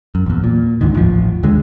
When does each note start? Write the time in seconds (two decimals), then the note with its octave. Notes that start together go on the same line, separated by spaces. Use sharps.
0.15 F#2
0.26 A#1 E2
0.44 A#2
0.81 D2 G#2 D3 D#3
0.94 A1 E2 F3
1.43 D#2 D3 G#3